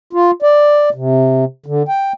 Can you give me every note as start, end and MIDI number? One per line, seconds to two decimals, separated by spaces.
0.13 0.31 65
0.42 0.89 74
0.94 1.45 48
1.66 1.83 50
1.89 2.13 79